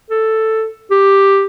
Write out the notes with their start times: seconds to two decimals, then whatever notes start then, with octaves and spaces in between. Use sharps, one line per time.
0.10 A4
0.91 G4